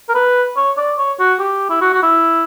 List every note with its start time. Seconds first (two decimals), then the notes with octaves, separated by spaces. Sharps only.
0.09 A#4
0.15 B4
0.57 C#5
0.78 D5
0.98 C#5
1.19 F#4
1.39 G4
1.70 E4
1.81 F#4
1.93 F#4
2.03 E4